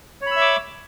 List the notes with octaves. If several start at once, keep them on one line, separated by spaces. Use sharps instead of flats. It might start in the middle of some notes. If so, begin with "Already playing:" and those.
C#5 E5 B5 D6 E6